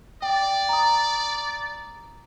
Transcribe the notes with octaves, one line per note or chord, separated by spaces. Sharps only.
D5 G5
A#5 D#6